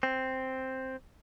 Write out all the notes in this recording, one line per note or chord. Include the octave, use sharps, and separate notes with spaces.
C4